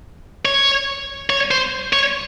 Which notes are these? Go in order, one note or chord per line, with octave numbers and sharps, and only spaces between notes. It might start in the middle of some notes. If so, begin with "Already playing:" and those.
C#5
C#5
C5
C#5